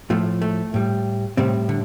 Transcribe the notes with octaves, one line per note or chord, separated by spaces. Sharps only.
A2 F3 A3
A3
A2 G3
A2 C3 G3 C4
D3